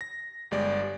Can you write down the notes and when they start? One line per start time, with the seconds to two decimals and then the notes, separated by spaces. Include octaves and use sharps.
0.01 A#6
0.51 G1 G3 G#3 D5